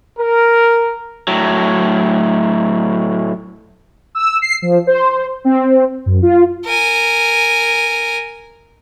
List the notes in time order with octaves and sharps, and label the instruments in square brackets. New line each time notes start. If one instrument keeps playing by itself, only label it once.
[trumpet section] A#4
[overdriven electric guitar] A2 F#3
[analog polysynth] E6
C7
F3
C5
C4
F#2
F4
[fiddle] A#4 G#5